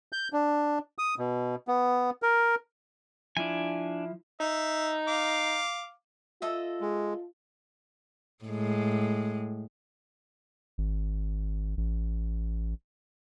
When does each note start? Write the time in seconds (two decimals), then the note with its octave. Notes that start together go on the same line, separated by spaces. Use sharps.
0.12 G6
0.33 D4
0.98 D#6
1.19 B2
1.68 B3
2.22 A#4
3.37 F3 D4 E4 G#5
4.40 D#4 E5
5.08 F5 D6
6.42 F4 A4 D#5 E5
6.81 G#3
8.44 A2 G#3
10.78 G#1
11.77 A1